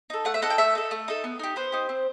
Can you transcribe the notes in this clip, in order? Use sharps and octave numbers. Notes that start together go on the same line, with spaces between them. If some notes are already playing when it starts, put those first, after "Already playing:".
D#4 A4
A3 F#5
E5
D#4 A4 F#5
G5
A3 E5
D#4 A4
A3
D#4 A4
B3
D#4 G4
B3 C5
D#4 G4
C4